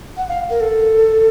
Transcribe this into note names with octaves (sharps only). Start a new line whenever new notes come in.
F#5
F5
A#4
A4